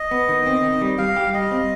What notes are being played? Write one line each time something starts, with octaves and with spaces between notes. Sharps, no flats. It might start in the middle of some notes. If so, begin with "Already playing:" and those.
Already playing: D#5
B3
D#3
C4
D#3
G3
G3 F5
G4
G3 D#5
C4